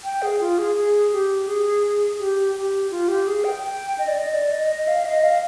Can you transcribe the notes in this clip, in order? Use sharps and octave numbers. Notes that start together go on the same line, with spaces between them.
G5
G#4
F4
G#4
G#4
G4
G#4
G4
G4
F4
G4
G#4
G5
G5
D#5
D5
D#5
D5
D#5
D#5
F5
D#5
F5